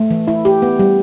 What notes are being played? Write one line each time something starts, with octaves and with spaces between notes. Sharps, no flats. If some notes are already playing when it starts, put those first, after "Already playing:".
Already playing: A3
E3
E4
G4
B3
G3